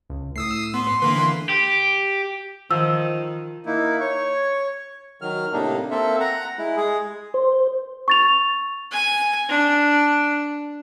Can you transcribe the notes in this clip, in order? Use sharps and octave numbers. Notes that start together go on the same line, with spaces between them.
C#2
A2 D#6 E6 C7
B3 C6
D3 E3 A#3 B4
G4
D#3 F3 E6
A#3 D#4 E4
C#5 C#6
D#3 F#3 F6
A2 C3 A#3 D4 D#4
A#3 C4 A4 E5
F#5 A#5
G#3 E4
G#3 G#4
C5
C#6 A6 F7
G#5
D4